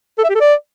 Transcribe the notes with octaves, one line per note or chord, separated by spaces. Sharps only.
A4
E5
G4
A4
D5